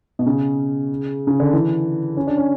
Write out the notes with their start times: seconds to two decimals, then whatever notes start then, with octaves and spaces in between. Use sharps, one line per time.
0.19 B2
0.26 C#3
1.27 C#3
1.40 D3
1.53 E3
2.17 C#4
2.27 D4
2.37 C#4